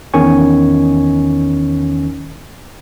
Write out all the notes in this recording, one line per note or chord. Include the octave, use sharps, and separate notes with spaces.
E2 D#3 C#4 G#5 C#6